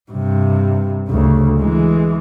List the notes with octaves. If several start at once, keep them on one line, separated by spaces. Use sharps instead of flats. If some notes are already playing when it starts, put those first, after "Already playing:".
G2 C3
D2 C#3
E3 G#3